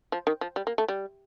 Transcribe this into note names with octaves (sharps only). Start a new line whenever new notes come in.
F3
D#3
F3
G3
A#3
A3
G3